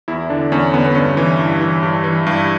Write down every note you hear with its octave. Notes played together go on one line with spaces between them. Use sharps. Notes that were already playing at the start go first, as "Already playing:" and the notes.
E2 E4
D3 D4
E2 C#4
D3 B3
B3
G2 C#4
E3
G2
E3
G2
E3
G2